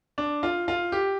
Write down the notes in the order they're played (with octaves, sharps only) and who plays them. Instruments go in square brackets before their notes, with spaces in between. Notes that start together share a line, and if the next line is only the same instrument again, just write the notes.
[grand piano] D4
F4
F4
G4